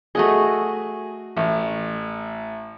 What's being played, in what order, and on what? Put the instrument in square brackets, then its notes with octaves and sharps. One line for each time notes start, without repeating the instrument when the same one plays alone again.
[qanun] A3 F#4 D#5 [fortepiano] G#4
[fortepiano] A1